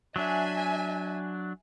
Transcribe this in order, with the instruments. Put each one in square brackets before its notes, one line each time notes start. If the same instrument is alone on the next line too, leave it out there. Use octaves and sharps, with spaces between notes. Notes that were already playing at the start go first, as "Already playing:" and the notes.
[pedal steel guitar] F#3 D4 [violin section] E5 G#5